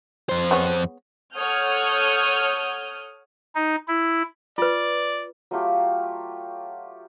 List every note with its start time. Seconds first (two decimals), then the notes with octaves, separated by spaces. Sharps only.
0.29 F2 C5
0.51 B3 G#4 C#5
1.34 A4 C#5 F#5 D#6 F6 G6
3.55 D#4
3.88 E4
4.58 F4 B4 D5
5.51 F#3 A3 F4 G4